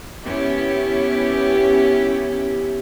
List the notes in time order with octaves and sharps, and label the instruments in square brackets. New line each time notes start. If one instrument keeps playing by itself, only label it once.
[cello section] B3 C#4 E4 G4